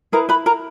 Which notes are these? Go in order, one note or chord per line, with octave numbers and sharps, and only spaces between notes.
E4 G#4 A#4 B4 A#5
B4 B5
A#4 A#5